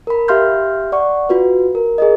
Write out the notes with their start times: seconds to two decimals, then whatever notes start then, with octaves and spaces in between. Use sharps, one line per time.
0.07 A#4 B5
0.28 G4 E5 F5 C6 F6 G6
0.92 D5 F#5 C#6
1.29 F4 F#4 B4
1.75 A#4
1.98 G#4 A#4 D#5